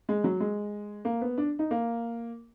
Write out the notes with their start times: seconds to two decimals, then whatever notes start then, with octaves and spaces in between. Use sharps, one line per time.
0.09 G#3
0.24 F#3
0.40 G#3
1.05 A#3
1.21 B3
1.38 D4
1.59 D#4
1.71 A#3